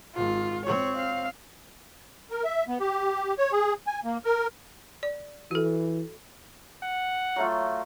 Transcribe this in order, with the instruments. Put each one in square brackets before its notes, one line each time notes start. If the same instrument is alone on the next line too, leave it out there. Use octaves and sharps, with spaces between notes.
[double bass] G#1 [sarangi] F4
[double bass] C4 [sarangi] C#5
[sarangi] F5
[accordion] A#4
E5
B3
G4
C#5
G#4
G#5
A#3
A#4
[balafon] D5
[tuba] E3 [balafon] F#4 A4
[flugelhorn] F#5
[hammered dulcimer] F#3 A3 F4